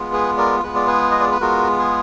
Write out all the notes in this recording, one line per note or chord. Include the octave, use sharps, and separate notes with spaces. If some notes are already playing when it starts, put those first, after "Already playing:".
Already playing: G#3 B3 F4
G#4 B4
A#4 D5
G#3 B3 F4 B4
D5
G#4 B4
D#5
D5
B4
G#3 B3 F4 F#4 A#4
G#4